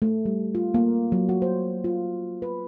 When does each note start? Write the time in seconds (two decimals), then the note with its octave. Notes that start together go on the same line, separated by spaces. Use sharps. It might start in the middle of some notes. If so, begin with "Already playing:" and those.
0.02 A3
0.25 G3
0.55 F4
0.74 A#3
1.12 F#3
1.29 F#4
1.42 C5
1.84 F4
2.42 B4